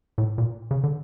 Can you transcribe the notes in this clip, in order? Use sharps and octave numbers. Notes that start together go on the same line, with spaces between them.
A2
A#2
C#3
D3